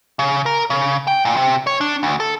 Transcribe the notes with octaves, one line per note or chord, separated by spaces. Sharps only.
C#3
A#4
C#3
G5
A#2
C3
C#5
D4
D2
A4